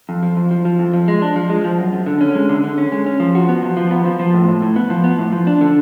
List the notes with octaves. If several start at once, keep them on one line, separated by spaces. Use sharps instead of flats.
F2
F3
F2
F3
F3
F2
F3
G#3
D4
F3
G#3
F3
F#2
F#2
D3
C#4
G#3
D3
D3
C#4
G#3
C#4
F3
F#4
B3
F3
F3
B3
F3
F3
A2
A2
A2
B3
F3
B3
A2
F3
D4
D3